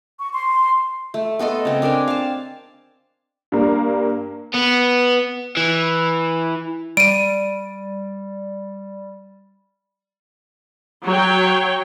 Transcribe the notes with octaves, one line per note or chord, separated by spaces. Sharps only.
C#6
C6
A3
B3 A4 D#5 C6
C#3 C4
D4 A#4 G5 G#5
F5 A5
G2 A#3
B3
E3
G3 D7 D#7
F#3 C#5 G5